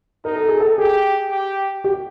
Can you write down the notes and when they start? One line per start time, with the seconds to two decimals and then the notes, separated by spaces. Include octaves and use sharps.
0.24 D#4 A#4
0.36 A4
0.48 G#4
0.60 A4
0.78 G4 G#4
1.30 G4
1.84 G4